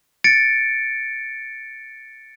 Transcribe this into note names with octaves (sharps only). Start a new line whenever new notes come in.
A6 C#7 D7